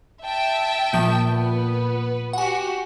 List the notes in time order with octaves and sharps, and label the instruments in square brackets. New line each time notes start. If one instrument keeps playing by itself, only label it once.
[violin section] E5 G5 A5
[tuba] A#2 [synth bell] F3 G6
[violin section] B3 B4
[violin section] F#4 G4 [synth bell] F#5 G#5